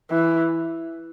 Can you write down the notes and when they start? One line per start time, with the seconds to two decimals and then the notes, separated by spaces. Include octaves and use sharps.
0.11 E3